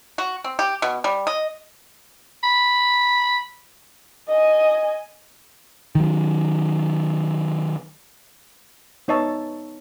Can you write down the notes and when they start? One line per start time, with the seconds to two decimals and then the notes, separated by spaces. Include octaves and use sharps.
0.18 F#4
0.44 C4
0.59 G4
0.82 B2
1.04 G3
1.27 D#5
2.43 B5
4.29 D#5 G#5
5.95 D#3 F#3
9.08 B3 D#4 C#5 D#5 E5 A5